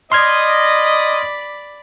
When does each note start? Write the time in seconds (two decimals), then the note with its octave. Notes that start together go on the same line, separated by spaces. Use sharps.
0.12 D5 D#5 B5 C6 F6 G#6